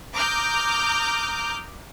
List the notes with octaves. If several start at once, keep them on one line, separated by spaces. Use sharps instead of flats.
A#5 D6 D#6 F6 G6